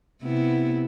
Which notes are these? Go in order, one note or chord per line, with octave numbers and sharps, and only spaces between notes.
C3 B3 E4